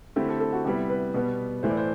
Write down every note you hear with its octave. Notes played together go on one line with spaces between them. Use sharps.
D3 A3 C4 E4 G4
A4
A4
F#4
C3 G3 B3 E4 G4
B4
B2 G3 B3
A2 E3 A3 C5
D5
C5